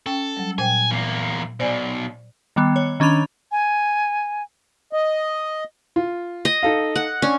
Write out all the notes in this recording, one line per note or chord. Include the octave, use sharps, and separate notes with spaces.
C#4 A4 G5
F#3 G3
A#2 C5 G5 G#5
E2 A#3
B1 B2 C5 D5 G#5
D#3 G3 B3
C#5
D#3 C#4 D4 B5 F7
G#5
D#5
F4
D#5
D#4 A4 F5
F#5
C#4 D4